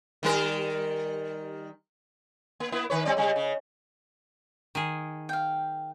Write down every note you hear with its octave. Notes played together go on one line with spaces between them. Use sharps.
D#3 G3 A#4
A#3
A#3 B3 E4
D#3 B4 C#5
G3 C4 D5
C#3 G3
C#3
D#3 G#4
F5 G5